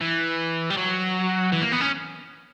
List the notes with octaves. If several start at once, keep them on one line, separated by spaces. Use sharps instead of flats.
E3
G3
F#3
E3
A#3
B3
C#4